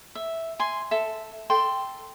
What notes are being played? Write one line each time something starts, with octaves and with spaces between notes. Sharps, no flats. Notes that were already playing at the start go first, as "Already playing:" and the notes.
E5
G#5 C6
A4 E5
A4 G5 C6